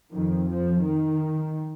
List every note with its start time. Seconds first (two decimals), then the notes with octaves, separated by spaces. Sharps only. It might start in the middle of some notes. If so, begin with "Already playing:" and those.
0.11 F2 D#3
0.47 F3
0.81 D#3